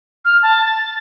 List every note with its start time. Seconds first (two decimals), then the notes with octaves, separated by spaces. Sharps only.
0.25 F6
0.42 A5
0.65 A6